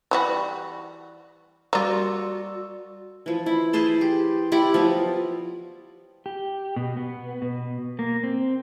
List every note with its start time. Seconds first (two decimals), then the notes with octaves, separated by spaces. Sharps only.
0.11 E3 G3 F#4
1.73 G3 A#3 F4 F#4 D5 E6
3.26 E3 F3
3.46 E4
3.73 G#4 B4 C5 A5
4.01 G4
4.52 E4 G4 D5 F#5
4.74 F3 F#3 B3
6.26 G4
6.76 B2
6.97 B3
7.42 B2
7.99 A#3
8.24 C4